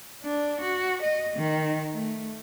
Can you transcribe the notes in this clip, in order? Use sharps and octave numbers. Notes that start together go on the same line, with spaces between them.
D4
F#4
D#5
D#3
A3